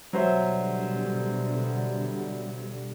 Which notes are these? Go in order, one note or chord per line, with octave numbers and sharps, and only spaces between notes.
B2 D3 F#3 G3 C5 E5